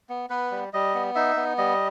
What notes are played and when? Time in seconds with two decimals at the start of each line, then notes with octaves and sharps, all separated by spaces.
0.09 B3
0.30 B3 B4
0.51 G3
0.73 G3 D#5
0.95 B3
1.15 D#4 E5
1.37 B3
1.58 G3 D#5